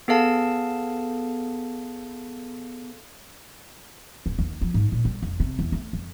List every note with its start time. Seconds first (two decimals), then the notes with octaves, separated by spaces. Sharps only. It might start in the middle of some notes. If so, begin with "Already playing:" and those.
0.08 B3 G#4 A4 F5 A5
4.26 D1
4.39 D#2
4.61 F3
4.74 G#2
4.92 A#2
5.05 G3
5.22 F1
5.40 C3
5.59 E2
5.72 A3
5.93 F2